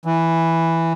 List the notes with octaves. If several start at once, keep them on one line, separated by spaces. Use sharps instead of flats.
E3